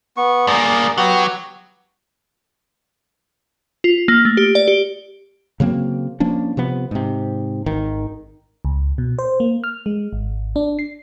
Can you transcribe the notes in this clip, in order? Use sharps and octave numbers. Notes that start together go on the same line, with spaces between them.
B3 C#6
G2 A#3 G#4 D5
F#3 B3 G4
F4
A#3
A3
G4
D5
G4
C#3 F#3 A#3 C4
F3 A#3 C#4 D4
C3 F3 B3
G#2 C3
G#1 D#3
C#2
B2
C5
A#3
F6
G#3
G#1
D4
C7